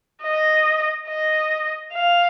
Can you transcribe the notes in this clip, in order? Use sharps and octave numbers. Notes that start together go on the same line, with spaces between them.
D#5
D#5
F5